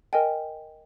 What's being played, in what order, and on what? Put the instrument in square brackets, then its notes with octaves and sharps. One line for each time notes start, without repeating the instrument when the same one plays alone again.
[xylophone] A#4 D#5 G5 G#5